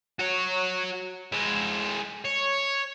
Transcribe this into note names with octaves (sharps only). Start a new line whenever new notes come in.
F#4 C#5
G#3 E4
C#5